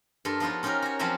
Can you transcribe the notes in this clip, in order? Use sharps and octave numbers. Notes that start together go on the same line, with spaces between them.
G2 A4 A#4 C6
F3 B3 D#4 F4 F#4
C#4 D#4 F4 G4 A#4
F#4 C#5
F3 F#3 C4 C#4 F#4 G4